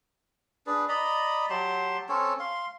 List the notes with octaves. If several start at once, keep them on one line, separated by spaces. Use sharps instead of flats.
D4 G#4 B4
D5 D#5 A#5 B5
F#3 G4 A5 C6
C4 C#4 A4 C#5
F5 C6